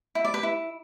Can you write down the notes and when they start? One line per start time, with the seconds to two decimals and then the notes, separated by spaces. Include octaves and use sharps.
0.15 E4
0.25 D5
0.34 B4
0.43 E4